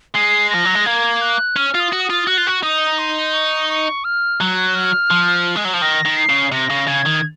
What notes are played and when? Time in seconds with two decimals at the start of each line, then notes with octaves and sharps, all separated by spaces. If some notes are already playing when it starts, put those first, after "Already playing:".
0.15 G#3 C7
0.50 F3 A#6
0.65 F#3
0.75 G#3
0.85 A#3 G#6
1.22 F#6
1.56 C#4 F6
1.74 F4
1.80 D#6
1.92 F#4
2.04 D#6
2.10 F4
2.27 F#4 F#6
2.38 F4
2.47 F#4
2.63 D#4 D#6
2.98 C6
3.33 C#6
3.69 C#6
4.04 F6
4.40 F#3 F#6
4.75 F6
5.11 F3
5.56 G#3
5.64 F#3
5.74 F3
5.82 D#3 A#6
6.06 D#3
6.17 C7
6.29 C#3
6.52 C3 A#6
6.70 C#3
6.87 C#3 G#6
7.06 D#3